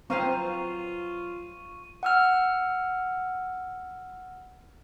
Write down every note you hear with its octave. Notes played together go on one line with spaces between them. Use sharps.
F#3 C4 F4 B4 C5 F5 C#6 D#7
F#5 E6 F6